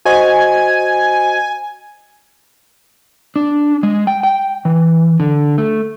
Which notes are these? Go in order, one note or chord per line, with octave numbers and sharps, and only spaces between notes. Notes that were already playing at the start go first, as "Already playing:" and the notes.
F#4 C5 D#5 G#5
D4
G#3
G5
G5
E3
D3
A3